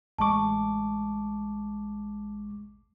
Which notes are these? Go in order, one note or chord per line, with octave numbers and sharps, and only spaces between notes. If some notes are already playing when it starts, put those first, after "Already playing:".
A1 G#3 A5 C#6 D6